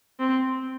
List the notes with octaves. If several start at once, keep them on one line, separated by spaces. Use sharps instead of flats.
C4